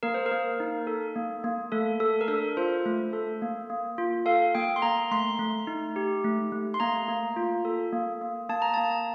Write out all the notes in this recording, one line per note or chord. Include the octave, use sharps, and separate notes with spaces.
A#3 A#4
C5
A#4
A#3
D#4
A4
A#3
A#3
A3 A4
A4
A#4
D4 A4
F4 C5
A3
A4
A#3
A#3
F4
A4 F5
A#3 G5
C6
A#3 A#5
A3 C6
A3
D#4
G4
A3
A3
C6
A#3 A#5
A#3
F4
A4
A#3
A#3
A#3 A5
A#5
A#3 A5